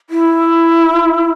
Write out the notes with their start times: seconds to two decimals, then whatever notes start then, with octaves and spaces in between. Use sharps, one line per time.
0.10 E4